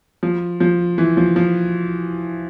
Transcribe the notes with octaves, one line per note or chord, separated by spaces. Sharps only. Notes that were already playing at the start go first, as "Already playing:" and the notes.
F3
F3
E3
F3
F3